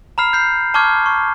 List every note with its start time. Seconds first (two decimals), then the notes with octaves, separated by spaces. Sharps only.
0.18 A#5 B5 F6 C7
0.33 G6 C7
0.74 A5 C#6 D6 F6 G#6
1.06 C#6